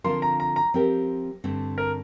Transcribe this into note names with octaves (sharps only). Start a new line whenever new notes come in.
D3 F3 C4 F4 A#4 C6
A#5
A#5
A#5
F3 C4 G4 A#4
G2 D3 A3 C4
A#4